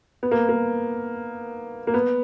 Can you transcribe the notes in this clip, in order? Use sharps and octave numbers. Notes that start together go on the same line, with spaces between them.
B3
A#3
A#3
A#3
B3